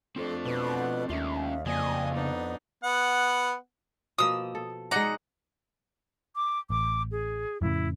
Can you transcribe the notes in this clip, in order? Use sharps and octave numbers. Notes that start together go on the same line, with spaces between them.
A3 C4 D4 F4 A4 C5
B2 B4
D#2 C#4 F4 E5
F2 C#3 A#3 D5 D#5 G#5
B3 D4 D#4
B3 F#5
B2 F3 A#3 D#6 E6
A4
G#3 D#4 D5 F#5 A#5
D6
A1 D6
G#4
F2 A2 C#3 E4